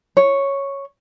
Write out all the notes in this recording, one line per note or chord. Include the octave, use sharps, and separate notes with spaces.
C#5